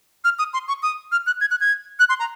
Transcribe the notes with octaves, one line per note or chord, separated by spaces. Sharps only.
F6
D#6
C6
C#6
D#6
F6
F#6
G#6
F#6
G#6
F#6
C6
A#5